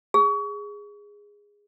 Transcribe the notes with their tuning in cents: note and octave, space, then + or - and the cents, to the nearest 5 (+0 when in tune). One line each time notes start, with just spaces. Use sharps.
G#4 -10